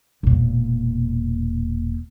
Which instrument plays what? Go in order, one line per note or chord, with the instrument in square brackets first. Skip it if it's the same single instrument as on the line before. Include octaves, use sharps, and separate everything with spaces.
[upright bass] E1 A#2